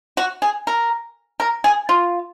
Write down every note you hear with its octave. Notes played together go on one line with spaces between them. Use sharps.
F#4
G#4
A#4
A#4
G#4
F4